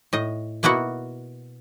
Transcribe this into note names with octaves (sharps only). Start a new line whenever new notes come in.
A2 D#5
B2 A#3 B3 E4 F#4 F#5